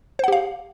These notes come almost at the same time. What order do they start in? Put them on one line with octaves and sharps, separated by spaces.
C5 F#5 G4 F5